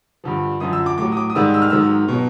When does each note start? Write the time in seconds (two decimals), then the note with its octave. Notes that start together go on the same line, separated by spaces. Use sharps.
0.24 G2 D3 F3
0.60 F#2 D3 F3 D#6
0.73 E6
0.86 D6
0.98 A2 F#3 D6
1.12 D#6
1.17 D6
1.30 D#6
1.35 G#2 D#3 G3 E6
1.54 E6
1.62 F6
1.70 G#2 D#3 F#3 E6
2.08 B2 F#3